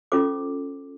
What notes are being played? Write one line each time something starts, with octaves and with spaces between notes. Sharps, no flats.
C#4 F4 A4 C5 D6